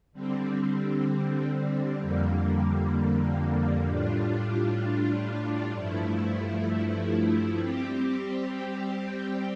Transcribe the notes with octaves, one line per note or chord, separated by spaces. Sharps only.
D3 G3 C4
F2 D3 G3 A#3
A2 G3 D4 F4
G2 F3 A3 E4
G3 C4 G4